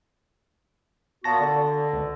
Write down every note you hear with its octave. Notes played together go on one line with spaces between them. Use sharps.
A#2 B3 F#4 A5 A#6
D3
C#2